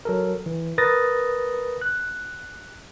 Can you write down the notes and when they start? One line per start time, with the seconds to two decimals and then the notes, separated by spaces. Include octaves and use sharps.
0.05 F#3 A4 A#4
0.46 E3
0.78 A#4 B4 D#6 A6 A#6
1.81 F#6